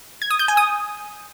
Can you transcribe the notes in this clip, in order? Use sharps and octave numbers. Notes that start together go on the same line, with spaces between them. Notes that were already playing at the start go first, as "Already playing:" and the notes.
G#6
D#6
G6
G#5
D#6